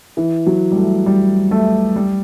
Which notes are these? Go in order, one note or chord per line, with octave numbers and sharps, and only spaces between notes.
E3
F#3
G3
A3
G3
A3
G3